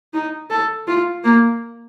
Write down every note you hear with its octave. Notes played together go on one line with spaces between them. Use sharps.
D#4
A4
F4
A#3